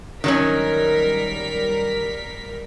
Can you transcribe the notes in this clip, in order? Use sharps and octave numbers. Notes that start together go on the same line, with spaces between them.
D#3 F#3 G3 C#4 A#4 B6